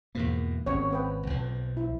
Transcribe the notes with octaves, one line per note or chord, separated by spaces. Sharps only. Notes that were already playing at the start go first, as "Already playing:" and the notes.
E2 G#2 B2 A#3
G#1 C4 C#4 C#5
C4 B4 G5
B1 F3
E4